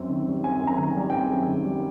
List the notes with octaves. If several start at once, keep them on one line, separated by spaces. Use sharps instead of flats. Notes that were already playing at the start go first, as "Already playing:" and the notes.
Already playing: F#2 C4
D#3
G3
C4 G#5
F#2
A#5
D#3
G#5
G3
G5
C4 G#5
F#2
D#3
G3